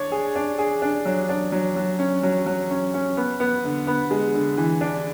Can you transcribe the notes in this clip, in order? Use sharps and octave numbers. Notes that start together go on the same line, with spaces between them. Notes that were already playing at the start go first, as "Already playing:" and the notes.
Already playing: D4 C#5
G#4
D4
G#4
D4
F#3
D4
F#3
F#3
C#4
F#3
F#3
C#4
C#4
B3
B3
D3
B3
G#3
D3
E3
D4